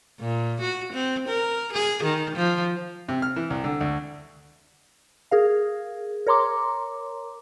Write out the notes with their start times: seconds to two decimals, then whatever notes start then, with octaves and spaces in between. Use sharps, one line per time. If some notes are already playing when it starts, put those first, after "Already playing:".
0.20 A#2
0.61 F#4
0.93 C4
1.28 A#4
1.73 G#4
2.04 D#3
2.36 F3
3.09 C3
3.22 F6
3.36 E3
3.50 C2
3.64 D3
3.81 D2
5.31 G#4 A#4 F5
6.27 A#4 C#5 A#5 C6 D6